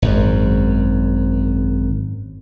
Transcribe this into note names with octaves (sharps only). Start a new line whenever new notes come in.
G#1 F#2